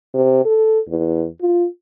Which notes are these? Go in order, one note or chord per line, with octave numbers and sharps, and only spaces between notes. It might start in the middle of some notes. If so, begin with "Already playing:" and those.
C3
A4
E2
F4